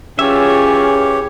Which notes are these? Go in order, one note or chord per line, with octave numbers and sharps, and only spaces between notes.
E3 C#4 F4 G4 G#4 C#5 E5